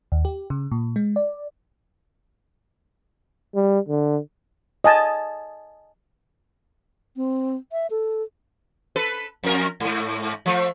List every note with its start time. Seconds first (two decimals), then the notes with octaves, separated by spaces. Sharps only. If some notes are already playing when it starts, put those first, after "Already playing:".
0.12 D#2
0.25 G4
0.50 C#3
0.72 A#2
0.96 G#3
1.16 D5
3.55 G3
3.88 D3
4.84 D#5 G#5 A5
7.16 C4
7.72 E5
7.90 A4
8.96 A4 B4
9.44 F2 A#4
9.80 G#2 A3
10.46 F3 A3